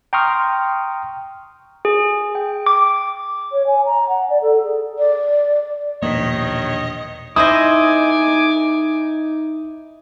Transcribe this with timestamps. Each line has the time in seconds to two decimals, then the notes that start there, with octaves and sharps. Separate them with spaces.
0.13 G5 A#5 C6 C#6 D#6 F6
1.85 G#4
2.35 G5
2.66 D6
3.52 C#5
3.67 G#5
3.85 A#5
4.09 F#5
4.29 D5
4.42 A4
4.63 G#4
4.99 D5
6.03 E1 A#1 G2 D#3 A#3 C#5 D#5 B6
7.36 D#4 E4 C5 D#5 G#5 D6 D#6